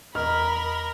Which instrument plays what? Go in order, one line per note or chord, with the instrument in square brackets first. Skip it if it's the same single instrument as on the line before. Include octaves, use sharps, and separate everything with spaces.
[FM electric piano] E2 D#5 [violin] A#4 [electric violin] B5 [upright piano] F6